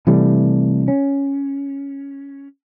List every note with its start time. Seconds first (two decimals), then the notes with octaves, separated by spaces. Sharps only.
0.07 C3 E3 G3 A3
0.88 C#4